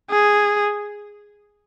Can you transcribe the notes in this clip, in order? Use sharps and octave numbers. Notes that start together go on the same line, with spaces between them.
G#4